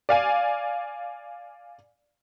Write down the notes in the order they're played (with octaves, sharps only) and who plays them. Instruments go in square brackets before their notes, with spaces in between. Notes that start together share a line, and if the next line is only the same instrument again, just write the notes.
[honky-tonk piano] D5 F5 G#5